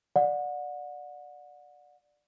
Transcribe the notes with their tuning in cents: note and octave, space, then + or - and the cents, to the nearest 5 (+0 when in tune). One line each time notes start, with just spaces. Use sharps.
D5 +10 F#5 -30